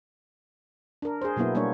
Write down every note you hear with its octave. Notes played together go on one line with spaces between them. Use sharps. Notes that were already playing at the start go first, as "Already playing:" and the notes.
D4 A#4
G#4 C5
B2 F#3 A#3 B3 E4
G3 A#3 B3 D4 C#5